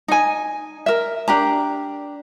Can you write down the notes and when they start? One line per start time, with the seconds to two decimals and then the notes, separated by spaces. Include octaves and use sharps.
0.08 D#4 G#5
0.86 A#4 E5
1.28 D4 G4 A#5